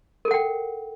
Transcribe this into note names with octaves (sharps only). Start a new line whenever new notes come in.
A4 A#4 F#5 G5